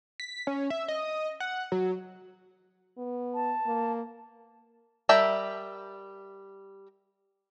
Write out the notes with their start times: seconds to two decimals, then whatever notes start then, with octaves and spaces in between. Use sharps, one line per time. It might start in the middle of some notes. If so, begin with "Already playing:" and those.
0.20 B6
0.47 C#4
0.70 E5
0.88 D#5
1.40 F#5
1.72 F#3
2.98 B3
3.34 A5
3.66 A#3
5.09 G3 A#4 E5 G5 A5